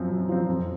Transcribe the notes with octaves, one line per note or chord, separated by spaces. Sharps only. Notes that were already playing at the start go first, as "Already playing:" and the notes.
Already playing: F#2 F3 C4
F#2
F3 C4
F2